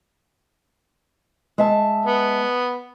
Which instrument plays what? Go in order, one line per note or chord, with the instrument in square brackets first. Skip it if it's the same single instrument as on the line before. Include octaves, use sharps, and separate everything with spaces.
[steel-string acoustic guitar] G#3 E5 A5
[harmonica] B3